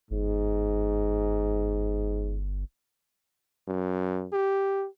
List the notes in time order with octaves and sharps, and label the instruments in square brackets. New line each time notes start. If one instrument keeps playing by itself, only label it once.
[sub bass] G1 [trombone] G#2
[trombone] F#2
G4